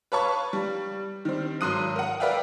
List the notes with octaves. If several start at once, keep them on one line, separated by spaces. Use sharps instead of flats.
B4 C#5 F5 A5 B5 C#6
G3
D#3 G3 C4
G#1 F#3 C6 D#6 F#6 D#7
A#4 F#5
A#4 B4 D5 E5 F5 G5